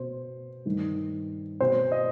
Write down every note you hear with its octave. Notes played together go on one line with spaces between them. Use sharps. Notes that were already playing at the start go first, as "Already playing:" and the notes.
Already playing: B2 C5
G2 D#3
B2 C5
D#5